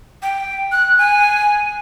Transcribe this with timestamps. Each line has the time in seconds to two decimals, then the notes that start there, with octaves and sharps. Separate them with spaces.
0.22 G5
0.72 F#6
0.98 G#5